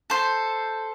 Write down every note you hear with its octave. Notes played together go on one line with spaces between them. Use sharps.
A4 C5